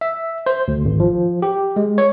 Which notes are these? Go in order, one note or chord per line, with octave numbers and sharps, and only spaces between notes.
E5
C5
D2
G#1
F3
G4
G#3
C#5